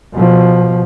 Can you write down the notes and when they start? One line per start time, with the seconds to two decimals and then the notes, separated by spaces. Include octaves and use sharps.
0.14 B2 F3